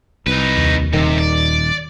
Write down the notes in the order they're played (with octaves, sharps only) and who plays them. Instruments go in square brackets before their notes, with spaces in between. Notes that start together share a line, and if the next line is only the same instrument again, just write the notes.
[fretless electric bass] C2 [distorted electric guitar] D#4 B4
[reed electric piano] D#2
[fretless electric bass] D#1 D#3 [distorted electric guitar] C3
[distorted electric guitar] D5